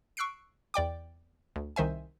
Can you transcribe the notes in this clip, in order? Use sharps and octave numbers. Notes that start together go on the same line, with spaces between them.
C#6 E6 F#6 C7 D7
E2 D5 G5 D6
D2
C2 D#3 C5 E5 G#5